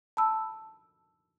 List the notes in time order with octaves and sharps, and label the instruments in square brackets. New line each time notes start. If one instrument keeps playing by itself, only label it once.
[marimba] A5 B5 E6